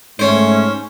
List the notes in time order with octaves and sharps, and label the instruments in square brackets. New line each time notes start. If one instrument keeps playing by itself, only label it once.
[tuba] G#2 [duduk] A3 [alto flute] C#4 [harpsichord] C5 C#5